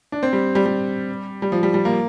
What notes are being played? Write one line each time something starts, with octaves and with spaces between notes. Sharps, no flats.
D4
C4
G3
G3
G3
G3
F3
G3
G3
A#3